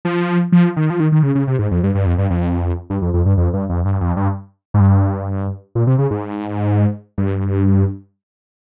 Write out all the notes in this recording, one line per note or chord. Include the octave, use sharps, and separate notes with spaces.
F3
F3
D#3
F3
D#3
D#3
C#3
C#3
C3
G#2
F2
G2
G2
F2
G2
F2
G2
F2
F2
G2
F2
G2
F2
G2
F2
G2
G#2
G2
A#2
C3
C#3
G#2
G2